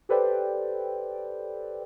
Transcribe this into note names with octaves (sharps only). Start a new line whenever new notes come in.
G4 A4 B4 C5 D5 G5